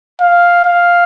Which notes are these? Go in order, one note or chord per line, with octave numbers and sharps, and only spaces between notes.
F5
F5